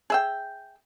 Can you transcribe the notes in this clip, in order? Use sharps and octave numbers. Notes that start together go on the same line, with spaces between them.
G#4 E5 G5